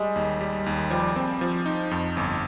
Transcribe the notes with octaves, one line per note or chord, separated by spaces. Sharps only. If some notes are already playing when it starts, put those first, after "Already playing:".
Already playing: G3 G#3
D#2
G3
D#2
F3 G3
C4
F3
D#4
F2
G1